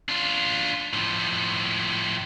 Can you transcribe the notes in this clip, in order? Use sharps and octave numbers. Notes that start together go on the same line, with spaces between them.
D4 F4
A2 F3